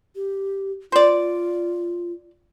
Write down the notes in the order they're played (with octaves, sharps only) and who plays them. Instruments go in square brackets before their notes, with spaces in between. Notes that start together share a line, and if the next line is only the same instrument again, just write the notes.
[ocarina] G4
[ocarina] F4 [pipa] C5 D5